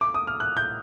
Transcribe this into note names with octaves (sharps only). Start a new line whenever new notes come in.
D6
D#6
F6
F#6
G6